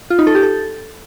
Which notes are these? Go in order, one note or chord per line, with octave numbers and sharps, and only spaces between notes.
F4
D#4
A4
G4
A4